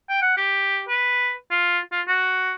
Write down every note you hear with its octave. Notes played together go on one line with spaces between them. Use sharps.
G5
F#5
G4
B4
F4
F4
F#4